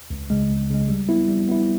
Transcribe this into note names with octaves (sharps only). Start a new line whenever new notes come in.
C#2
C#3 G#3
C#2
C#3 G#3
G3
B3 E4
G3
B3 E4